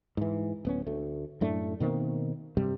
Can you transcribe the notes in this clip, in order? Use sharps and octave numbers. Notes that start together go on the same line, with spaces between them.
G#2 E3
D1 B3 C#4
D2 A3
F#2 A2 A3 D4
B2 D#3 A#3 C4
G2 C3 G3